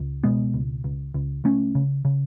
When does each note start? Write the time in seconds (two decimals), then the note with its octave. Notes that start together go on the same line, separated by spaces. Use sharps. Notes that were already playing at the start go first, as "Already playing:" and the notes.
Already playing: C#2
0.24 B2 G#3 B3
0.54 C#2
0.84 C#2
1.14 C#2
1.44 C#2 A3 C#4
1.75 C#3
2.05 C#3